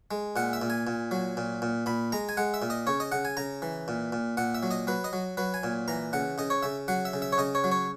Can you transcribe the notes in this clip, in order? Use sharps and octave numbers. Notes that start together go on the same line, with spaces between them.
G#3
A#2 F#5
E5
A#2
G#5
A#2
F#3
A#2
A#2
A#2 B5
G#3 A#5
G#5
G#3 F#5
E5
A#2
D#5
C#3 C#5
D#5
C#3 F#5
G#5
C#3 A#5
E3
A#2
A#2
A#2 F#5
E5
F#3
D#5
F#3 B4
D#5
F#3
F#3 B4
G#5
A#2
E3 A#5
C#3 F#5
C#3 D#5
C#5
C#3 E5
F#3 F#5
E5
C#3
E5
C#5
C#3 D#5
C#5
F#3
C#5